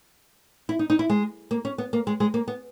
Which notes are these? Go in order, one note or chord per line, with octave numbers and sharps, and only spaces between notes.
E4
D#4
D#4
E4
G#3
A#3
C#4
B3
A#3
G#3
G#3
A#3
B3